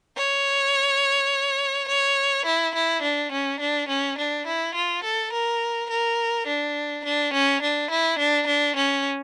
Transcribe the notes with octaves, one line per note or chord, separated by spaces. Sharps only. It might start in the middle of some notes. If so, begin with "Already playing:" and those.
C#5
C#5
E4
E4
D4
C#4
D4
C#4
D4
E4
F4
A4
A#4
A#4
D4
D4
C#4
D4
E4
D4
D4
C#4